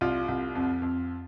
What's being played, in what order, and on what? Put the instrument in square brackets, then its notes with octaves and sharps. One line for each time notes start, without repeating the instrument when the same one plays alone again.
[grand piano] C2 F4
C2
F2
F2